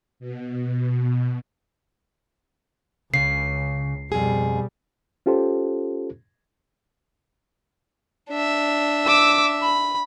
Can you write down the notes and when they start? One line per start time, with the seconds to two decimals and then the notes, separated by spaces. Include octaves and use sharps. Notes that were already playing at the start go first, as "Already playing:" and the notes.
0.20 B2
3.14 C#2 C#3 C7
4.12 F2 B2 G3 G#4
5.26 C#4 F4 G4 A4 C5
8.30 D4 E5
9.05 D6 E6
9.62 B5